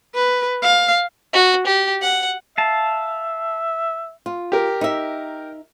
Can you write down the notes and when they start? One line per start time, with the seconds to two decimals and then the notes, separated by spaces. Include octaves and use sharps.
0.15 B4
0.63 F5
1.33 F#4
1.66 G4
2.02 F#5
2.58 E5 F5 A5
4.26 F4
4.52 G4 A#4
4.81 D#4 E5